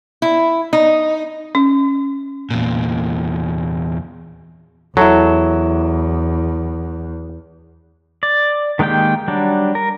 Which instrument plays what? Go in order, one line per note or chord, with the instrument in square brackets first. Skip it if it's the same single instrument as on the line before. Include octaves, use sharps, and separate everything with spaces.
[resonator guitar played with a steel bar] E4
D#4
[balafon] C#4
[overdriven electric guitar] E2 A#2
[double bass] E2 [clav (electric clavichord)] F#3 [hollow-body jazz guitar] E4 A4
[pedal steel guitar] D5
D#3 G#3 A#3 G4 G5
F#3 G3 D4
A#4